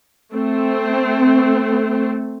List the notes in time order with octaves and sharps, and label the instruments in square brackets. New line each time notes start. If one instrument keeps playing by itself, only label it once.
[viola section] A3 C4